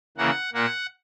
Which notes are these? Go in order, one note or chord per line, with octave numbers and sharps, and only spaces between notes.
C#3 E3 A#3 F#5
A#2 A#3 F#5